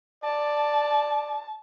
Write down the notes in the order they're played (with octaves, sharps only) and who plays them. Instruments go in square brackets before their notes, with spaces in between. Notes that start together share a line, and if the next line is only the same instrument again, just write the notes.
[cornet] D5 [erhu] A5